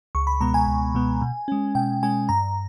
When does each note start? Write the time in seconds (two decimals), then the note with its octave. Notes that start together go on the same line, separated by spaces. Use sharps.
0.15 C#2 C#6
0.27 B5
0.41 B2 G#3 B3 A#5
0.54 G#5
0.67 C#2
0.95 B2 G#3 B3
1.22 B2
1.48 G#3 C#4
1.75 B2 G5
2.03 G#3 C#4 G#5
2.29 G2 A#5